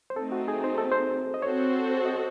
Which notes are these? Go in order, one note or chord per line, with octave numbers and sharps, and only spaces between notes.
C5
A3 C4 D#4 A4
F#4
G#4
C5
A4
C5
D#5
C4 F#4 A4 C5 C#5
D#5